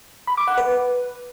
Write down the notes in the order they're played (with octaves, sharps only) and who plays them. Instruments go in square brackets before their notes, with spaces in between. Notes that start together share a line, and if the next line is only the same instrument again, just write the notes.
[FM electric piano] B5
D6
F#5
B4